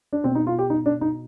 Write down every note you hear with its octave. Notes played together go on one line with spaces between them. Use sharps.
D4
B2 C4
D#4
F4
G4
D#4
D4
D#4